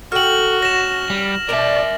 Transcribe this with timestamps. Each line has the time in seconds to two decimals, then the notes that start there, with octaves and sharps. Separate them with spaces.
0.12 F#4 A4 G5 F6 F#7
0.62 C#4 A#6 E7
1.10 G3
1.49 B2 G3 D4 A#4 D5 E5